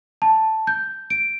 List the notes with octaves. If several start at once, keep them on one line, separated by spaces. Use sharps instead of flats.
A5
G6
D7